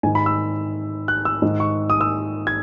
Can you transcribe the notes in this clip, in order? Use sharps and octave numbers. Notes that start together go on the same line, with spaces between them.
G#2 D#3 G#5
B5
E6
F#6
E6
G#2 D#3
C#6
D#6
E6
G#6